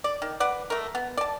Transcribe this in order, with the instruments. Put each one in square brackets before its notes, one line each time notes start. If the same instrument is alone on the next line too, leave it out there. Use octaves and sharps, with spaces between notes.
[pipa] D5
D#3
B4 D5 F#5
A3 A#4
B3
D5 A5